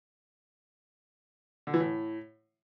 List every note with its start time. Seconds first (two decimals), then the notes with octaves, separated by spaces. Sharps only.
1.67 D3
1.74 E3
1.80 A2